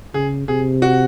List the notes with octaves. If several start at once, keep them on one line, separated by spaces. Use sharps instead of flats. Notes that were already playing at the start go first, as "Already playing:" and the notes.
C#3 G#4
C3 G#4
F#4